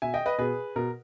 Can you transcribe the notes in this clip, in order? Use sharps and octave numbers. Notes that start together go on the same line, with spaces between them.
B2 E5 G#5
D#5 G5
B4 D#5
B2 G#4 B4
B2 A#4